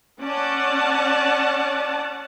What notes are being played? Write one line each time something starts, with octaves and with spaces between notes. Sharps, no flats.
C#4 D5 F#5 A5